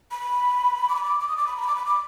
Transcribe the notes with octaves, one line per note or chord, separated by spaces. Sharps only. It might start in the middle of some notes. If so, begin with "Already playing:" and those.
B5
D6
B5
D6
D6
D#6
D6
B5
A#5
B5
D6
B5
D6